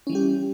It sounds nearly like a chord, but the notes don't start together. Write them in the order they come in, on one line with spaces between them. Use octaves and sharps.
C#4 E3 G3 G4